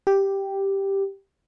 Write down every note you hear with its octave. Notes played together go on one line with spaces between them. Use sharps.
G4